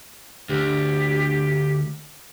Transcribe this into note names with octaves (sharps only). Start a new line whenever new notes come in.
D2 G4